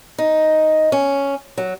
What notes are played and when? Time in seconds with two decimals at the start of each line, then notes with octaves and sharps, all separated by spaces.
0.18 D#4
0.92 C#4
1.58 F#3